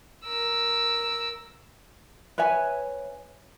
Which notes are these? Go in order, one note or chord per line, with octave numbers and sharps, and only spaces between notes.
A#4 E6
B4 C#5 E5 G#5